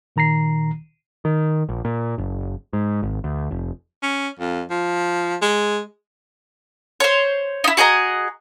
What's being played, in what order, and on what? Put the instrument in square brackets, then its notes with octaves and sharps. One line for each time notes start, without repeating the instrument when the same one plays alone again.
[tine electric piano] A#2 D#3 A#5 A#6 C7
[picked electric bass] D#3
A#1
A#2
F#1
G#2
G#1
D2
F1
[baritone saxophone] C#4
F2
F3
G#3
[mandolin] C5 C#5
D#4 E4
F#4 G#4 D#5 A#5